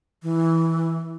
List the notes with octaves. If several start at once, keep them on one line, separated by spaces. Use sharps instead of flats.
E3